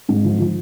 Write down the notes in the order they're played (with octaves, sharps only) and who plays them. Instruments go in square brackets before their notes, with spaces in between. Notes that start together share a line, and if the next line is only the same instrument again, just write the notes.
[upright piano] G#2
F3
F3